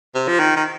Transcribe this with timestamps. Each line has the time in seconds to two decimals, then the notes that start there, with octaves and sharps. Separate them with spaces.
0.15 C3
0.28 F3
0.39 D#3
0.56 D#3